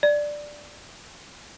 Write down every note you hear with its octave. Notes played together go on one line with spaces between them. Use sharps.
D5